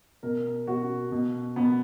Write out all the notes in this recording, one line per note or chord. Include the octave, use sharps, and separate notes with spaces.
B2 A#4
B2 F#4
B2
B2 B3